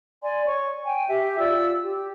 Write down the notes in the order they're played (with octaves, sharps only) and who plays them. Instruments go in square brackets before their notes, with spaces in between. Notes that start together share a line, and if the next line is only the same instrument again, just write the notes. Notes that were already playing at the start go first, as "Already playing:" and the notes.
[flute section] D5 G#5 C6
C#5 C#6
G5 G#5
G4 E5
F4 D5 E6
G4